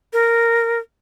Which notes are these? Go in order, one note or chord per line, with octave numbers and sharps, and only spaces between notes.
A#4